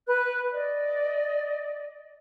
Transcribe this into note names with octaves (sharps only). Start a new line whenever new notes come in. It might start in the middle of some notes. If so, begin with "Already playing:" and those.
B4 F#6
D5 D#5